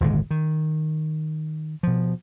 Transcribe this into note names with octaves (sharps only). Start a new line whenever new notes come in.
D#1 G#1 D3 G#3
D#3
B2 F3